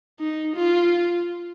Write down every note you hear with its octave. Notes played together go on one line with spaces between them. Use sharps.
D#4
F4